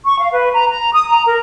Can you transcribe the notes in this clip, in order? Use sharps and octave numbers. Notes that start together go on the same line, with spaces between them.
C#6
F5
B4
A#5
A#5
D#6
A#5
A#4